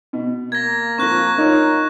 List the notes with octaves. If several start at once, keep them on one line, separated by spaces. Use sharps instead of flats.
B2
A#3 G#6 A#6
F3 C4 C#6 F#6 A#6
D#4 F4 A#4 C#5